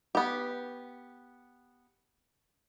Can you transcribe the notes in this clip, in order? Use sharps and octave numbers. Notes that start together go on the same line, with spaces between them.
B3 G4